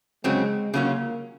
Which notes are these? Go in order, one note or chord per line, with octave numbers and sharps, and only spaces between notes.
C#3 F#3 G#3 C4
C#3 F#3 A#3 C#4 F4